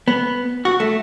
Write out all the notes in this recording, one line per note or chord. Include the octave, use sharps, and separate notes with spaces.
B3
F#4
A3